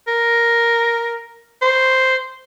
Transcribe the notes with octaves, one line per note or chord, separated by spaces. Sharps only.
A#4
C5